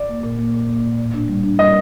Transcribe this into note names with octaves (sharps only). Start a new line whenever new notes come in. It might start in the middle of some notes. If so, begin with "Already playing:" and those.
Already playing: D5
A#3
A#2
A#3
A#2
A#3
A#2
A2
D4
G3
D4
G3 D#5